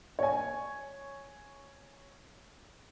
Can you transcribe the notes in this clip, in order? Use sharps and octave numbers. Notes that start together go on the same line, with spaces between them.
C#5 G#5